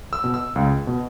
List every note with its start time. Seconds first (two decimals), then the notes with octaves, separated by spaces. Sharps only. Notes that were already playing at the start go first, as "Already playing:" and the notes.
0.13 E6
0.24 B2
0.34 E6
0.56 C#2
0.87 B2